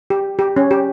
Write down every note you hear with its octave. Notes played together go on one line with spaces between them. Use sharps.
G4
G4
C#4
G4